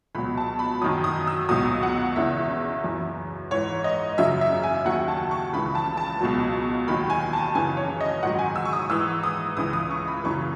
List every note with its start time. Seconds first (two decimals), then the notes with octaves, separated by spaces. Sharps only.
0.15 C#2 B5
0.17 B2 F#3
0.37 A5
0.59 B5
0.81 F#3 D#6
0.84 F#2 D#3
1.04 D#6
1.27 E6
1.49 C#2 B2 F#3 D#6
1.83 F#5
2.16 E2 C#3 E3 E5
2.84 F#2 E3
3.51 G#2 E3 C#5
3.84 D#5
4.18 F#2 C#3 F#3 E5
4.41 E5
4.63 G#5
4.85 D#2 D#3 F#3 F#5
5.08 A5
5.31 C#6
5.53 C#2 C#3 E3 B5
5.75 A5
5.97 A5
6.20 C#2 B2 F#3
6.87 D#2 D#3 F#3 B5
7.10 G#5
7.33 A5
7.55 F#2 C#3 E3 G#5
7.77 C#5
8.01 D#5
8.23 G#2 D#3 F#3 F#5
8.39 G#5
8.56 E6
8.65 C#6
8.73 D#6
8.89 G#2 E3 E6
9.23 D#6
9.57 C#2 C#3 E3 D#6
9.73 D#6
9.91 C#6
10.08 B5
10.24 F#2 C#3 E3 C#6